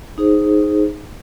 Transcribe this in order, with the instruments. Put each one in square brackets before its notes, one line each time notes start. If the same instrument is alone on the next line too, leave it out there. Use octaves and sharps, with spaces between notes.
[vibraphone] D#4 G#4 C5